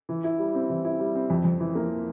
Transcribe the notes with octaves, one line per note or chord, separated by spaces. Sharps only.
E3
E4
G3
C4
E3
E4
G3
C4
F2
F2
E3
A#3